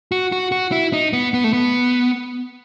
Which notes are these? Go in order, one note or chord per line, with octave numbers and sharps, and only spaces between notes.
F#4
F#4
F#4
E4
D#4
B3
B3
A3
B3